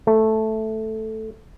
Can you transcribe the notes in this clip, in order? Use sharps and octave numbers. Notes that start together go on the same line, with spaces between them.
A3